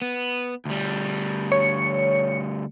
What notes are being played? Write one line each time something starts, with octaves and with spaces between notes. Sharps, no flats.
B3
D2 G3
C#5 C#7